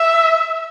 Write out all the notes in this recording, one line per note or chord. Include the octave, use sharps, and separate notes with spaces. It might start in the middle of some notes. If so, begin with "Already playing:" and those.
Already playing: E5